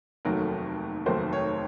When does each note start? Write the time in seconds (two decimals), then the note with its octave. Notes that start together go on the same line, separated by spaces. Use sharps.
0.25 F1 D#2 D#3 F#3 A3 A#4
1.06 F1 D#2 D#3 F#3 A3 C5
1.33 C#5